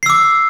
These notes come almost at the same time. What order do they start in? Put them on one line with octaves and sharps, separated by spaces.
C7 E6 D6